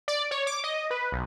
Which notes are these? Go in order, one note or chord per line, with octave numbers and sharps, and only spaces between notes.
D5
C#5
D6
D#5
B4
B1